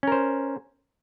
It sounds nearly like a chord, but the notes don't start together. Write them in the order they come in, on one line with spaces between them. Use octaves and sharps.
C#4 A#4 C5